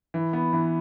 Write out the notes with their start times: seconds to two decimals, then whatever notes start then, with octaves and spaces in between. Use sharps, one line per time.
0.14 E3
0.33 B3
0.53 E3